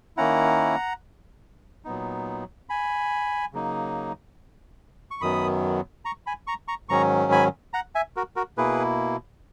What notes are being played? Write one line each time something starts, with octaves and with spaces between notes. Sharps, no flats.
D#3 A#3 C#4 E4 F#5 A#5
A#2 F#3 B3 D#4
G#5 B5
C#3 F#3 A#3 D#4
C#6
F#2 D#3 F#3 B3 B5 D#6
A#5 C#6
G#5 B5
A#5 C#6
A#5 C#6
G#2 D#3 F#3 C#4 A#5 C#6
G#5 B5
F#5 A#5
E5 G#5
F#4 A#4
F#4 A#4
B2 A#3 E4 G#4 B4